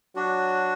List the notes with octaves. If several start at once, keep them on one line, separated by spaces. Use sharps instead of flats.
F#3 D4 F#4